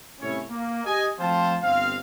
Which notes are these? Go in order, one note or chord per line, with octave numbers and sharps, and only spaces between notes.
C2 A2 C#4 E4 C#5
A#3
G4 D#5 G#5
F3 A3 C4 C5 F5 A5
G1 C4 F5